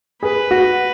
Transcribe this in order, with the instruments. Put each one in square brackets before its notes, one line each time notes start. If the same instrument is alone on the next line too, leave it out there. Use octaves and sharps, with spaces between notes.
[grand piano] G#4 [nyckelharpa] B4
[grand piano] F#4